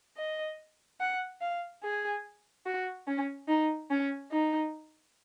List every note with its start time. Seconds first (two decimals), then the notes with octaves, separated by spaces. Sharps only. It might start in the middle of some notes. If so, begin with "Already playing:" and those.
0.17 D#5
1.00 F#5
1.41 F5
1.83 G#4
2.66 F#4
3.07 C#4
3.48 D#4
3.90 C#4
4.31 D#4